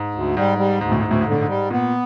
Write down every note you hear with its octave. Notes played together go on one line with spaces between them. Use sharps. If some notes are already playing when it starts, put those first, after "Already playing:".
Already playing: G#2
D2
G#2 G3
G3
D2 G#2
A2
D2 G#2
A2
G#2
A2 D3
G#2
G3
A#2 B3